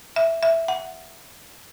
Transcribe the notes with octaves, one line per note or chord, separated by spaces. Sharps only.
E5
E5
F#5